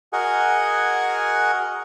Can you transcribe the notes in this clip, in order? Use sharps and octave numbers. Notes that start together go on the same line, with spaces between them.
F#4 G#4 A#4 D#5 F#5 G#5